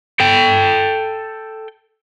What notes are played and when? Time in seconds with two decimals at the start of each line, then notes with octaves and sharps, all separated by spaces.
0.20 A4 G5